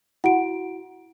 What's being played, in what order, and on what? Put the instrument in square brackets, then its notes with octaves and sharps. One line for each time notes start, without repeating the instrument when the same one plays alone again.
[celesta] E4 F#4 D7 [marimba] F#5